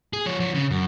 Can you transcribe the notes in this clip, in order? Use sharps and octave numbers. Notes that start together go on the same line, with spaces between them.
G#4
F3 C#5
F3 C#5
C#3
F#2